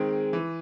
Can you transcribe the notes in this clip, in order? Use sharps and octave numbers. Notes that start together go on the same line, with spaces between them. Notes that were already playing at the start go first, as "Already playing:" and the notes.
Already playing: D#3 G#3 C4
E3